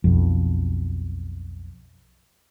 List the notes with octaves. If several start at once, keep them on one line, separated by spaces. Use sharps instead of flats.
B1 F2